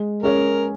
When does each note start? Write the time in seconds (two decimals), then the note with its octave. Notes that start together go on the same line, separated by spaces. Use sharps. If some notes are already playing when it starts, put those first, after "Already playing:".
Already playing: G#3
0.23 C#4 G#4 A#4 C#5